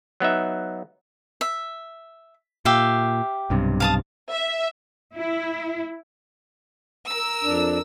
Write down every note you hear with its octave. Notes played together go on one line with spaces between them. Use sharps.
F#3 B3 D#4 E5
E5
A#2 G4 E5 F5
B1 G2 C3
F5 A5 D#6
E5
E4
A#4 E6
F2 D4